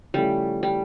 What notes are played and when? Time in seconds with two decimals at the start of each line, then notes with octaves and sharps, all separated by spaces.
0.14 C#3 F3 G3 A3 C#4 E4
0.63 G3